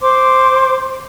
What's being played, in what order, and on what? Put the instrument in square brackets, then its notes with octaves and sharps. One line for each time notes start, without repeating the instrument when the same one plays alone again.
[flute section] C5 C6 D6